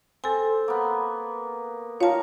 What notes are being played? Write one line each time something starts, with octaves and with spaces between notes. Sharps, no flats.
C4 A4 G#5
A#3 B3
D#3 F4 A#4 C#5 A5